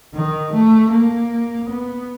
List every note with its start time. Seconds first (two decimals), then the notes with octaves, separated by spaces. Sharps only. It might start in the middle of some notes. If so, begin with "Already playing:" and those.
0.14 D#3
0.53 A3
0.92 A#3
1.70 B3